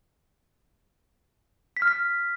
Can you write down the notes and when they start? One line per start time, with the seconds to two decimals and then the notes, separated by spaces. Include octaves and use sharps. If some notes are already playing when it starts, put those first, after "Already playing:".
1.77 B6
1.82 F6
1.88 B6